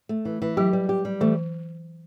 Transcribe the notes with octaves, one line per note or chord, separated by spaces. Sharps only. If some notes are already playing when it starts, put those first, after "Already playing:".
A3
E3
E3
F#3 G4
G3
G4
G3
E3 A3